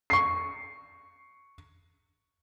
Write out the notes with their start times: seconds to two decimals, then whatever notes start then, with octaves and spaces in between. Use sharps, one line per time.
0.10 C#6 C7